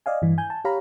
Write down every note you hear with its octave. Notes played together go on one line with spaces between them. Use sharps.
D5 D#5 F5 G#5
G2 E3
G#5 G6
A5
G4 C#5 F5 A#5 B5